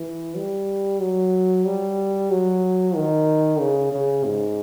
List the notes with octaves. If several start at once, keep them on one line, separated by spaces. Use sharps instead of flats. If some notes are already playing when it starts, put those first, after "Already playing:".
Already playing: E3
G3
F#3
G3
F#3
D#3
C#3
C#3
G#2